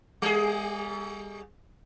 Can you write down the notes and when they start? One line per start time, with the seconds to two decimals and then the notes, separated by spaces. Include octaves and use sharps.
0.22 G3 G#4